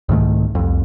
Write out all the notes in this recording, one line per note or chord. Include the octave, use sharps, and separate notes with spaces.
C2 G#2 D#3 A3
C2 F2